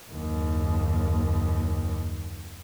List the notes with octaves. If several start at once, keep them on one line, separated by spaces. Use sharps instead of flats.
F#1 D#2